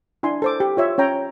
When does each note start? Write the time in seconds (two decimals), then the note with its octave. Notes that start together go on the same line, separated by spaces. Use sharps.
0.23 D4 E4 G#5 C6
0.42 A4 C5 D6
0.60 G4
0.77 F4 C#5 E5
0.98 C#4 C#5 G5 A#5